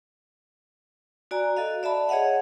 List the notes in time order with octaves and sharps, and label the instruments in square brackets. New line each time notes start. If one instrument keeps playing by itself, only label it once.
[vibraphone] F#4 D5 G#5 A#5
F#4 A4 D#5 F5
D5 E5 F5 A5 B5
G#4 C#5 D#5 F5 F#5